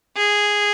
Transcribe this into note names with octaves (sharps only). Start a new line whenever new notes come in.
G#4